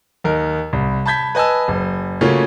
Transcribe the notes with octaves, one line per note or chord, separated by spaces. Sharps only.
D#2 D#4 A#4
C2
A5 B5 G6 G#6 B6
B4 D#5 G#5 A5 E6
F#1
C#3 A3 A#3 C#4 F4 F#4